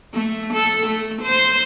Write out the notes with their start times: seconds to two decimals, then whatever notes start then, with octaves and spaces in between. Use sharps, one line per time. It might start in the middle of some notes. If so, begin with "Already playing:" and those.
0.13 A3
0.54 A4
0.86 A3
1.22 C5